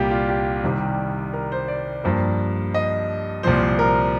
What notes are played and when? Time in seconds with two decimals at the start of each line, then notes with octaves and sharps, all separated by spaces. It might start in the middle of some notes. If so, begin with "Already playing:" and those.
Already playing: C2 A#2 G3 A#3 F4 G4
0.11 F4
0.29 G4
0.64 C2 C3 D#3 G3
1.34 A#4
1.52 C5
1.68 D5
2.04 G2 F3 A#3
2.74 D#5
3.43 C2 A#2 F3 C5
3.79 A#4